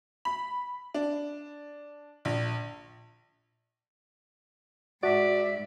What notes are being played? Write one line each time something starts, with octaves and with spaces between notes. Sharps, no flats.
B5
D4
A#1
G#2 F#4 D5 E5